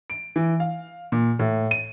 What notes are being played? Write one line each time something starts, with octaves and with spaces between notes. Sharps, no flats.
D7
E3
F5
A#2
A2
D#7